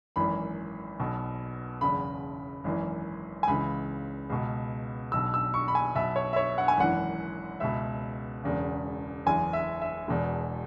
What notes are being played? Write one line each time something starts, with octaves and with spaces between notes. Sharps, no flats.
G#1 F#2 E3 B5
B1 B2
F#1 E2 C#3 B5
G#1 F#2 E3
G#5
C#2 C#3 E3 B5
C#2 B2
B1 B2 E6
E6
C#6
B5
G#5
B1 B2 E5
C#5
E5
C#5
F#5
G#5
G#1 F#2 E3 F#5
C#2 B2 E5
E1 E2 C#3
F#1 E2 E3 G#5
E5
E5
E1 E2 B2